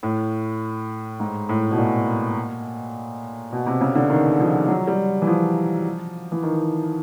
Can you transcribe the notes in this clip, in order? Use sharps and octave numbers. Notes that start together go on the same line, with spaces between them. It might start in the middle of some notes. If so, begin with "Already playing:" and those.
A2
G#2
A2
B2
A#2
B2
C3
C#3
D3
D#3
F3
F#3
G3
E3
F3
E3
D#3